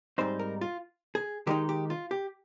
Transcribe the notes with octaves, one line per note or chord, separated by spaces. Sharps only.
G#2 G3 C4 D#4 C5
A#4
F4
G#4
D#3 G#3 D#4 G4
G4
F4
G4